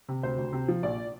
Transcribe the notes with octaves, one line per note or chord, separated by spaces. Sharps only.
C3
D2 C5
D2
C3
F3
A#1 D5